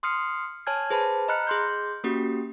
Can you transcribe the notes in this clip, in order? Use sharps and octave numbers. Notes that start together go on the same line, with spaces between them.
C6 D#6 F6 C7 C#7
C#5 G#5 A5 F6 G#6
G#4 B4 C5 A5 B5
D#5 A#5 B5 F6 F#6 C#7
G#4 C6 G6
A#3 C#4 F#4 G4